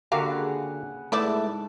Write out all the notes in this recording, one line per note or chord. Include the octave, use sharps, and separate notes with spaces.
D3 A#3 F#4 G4 B4 F5 A#5
C#3 F#5
G#2 A3 B3 E4 A4 D5